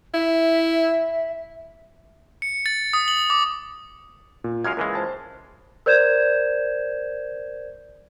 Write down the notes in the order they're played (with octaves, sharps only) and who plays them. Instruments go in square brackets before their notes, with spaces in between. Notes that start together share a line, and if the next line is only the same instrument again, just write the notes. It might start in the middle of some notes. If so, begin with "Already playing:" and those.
[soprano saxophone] E4 [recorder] E5
[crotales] C#7
A6
D#6
F#7
D6
[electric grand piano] A#2
[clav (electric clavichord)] F#2 G#3 F5 [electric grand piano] F6 G#6
[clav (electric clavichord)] C#2 E3 G#3 [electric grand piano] A#4
[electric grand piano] C5 A5 A6
[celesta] A#4 C5 D5 G6 G#6 E7